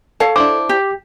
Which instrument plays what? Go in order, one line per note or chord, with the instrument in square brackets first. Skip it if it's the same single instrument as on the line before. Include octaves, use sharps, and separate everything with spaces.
[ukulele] A4 C#5 F5 [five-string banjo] A5
[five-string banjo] D4 E4 C5 [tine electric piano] D6
[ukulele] G4